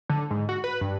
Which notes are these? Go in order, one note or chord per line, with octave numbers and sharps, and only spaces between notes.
D3
G#2
F#4
B4
G2